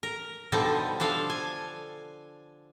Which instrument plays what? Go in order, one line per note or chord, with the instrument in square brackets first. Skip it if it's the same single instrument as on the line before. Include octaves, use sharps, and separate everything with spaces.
[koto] A#4
B2 D3 F3 G3 D#4 A4
F3 D4 A4 F5
G#5